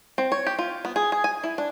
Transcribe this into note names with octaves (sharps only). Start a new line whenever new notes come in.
C4
C#5
G4
F4
B3
G#4
G#4
G#5
E4
D4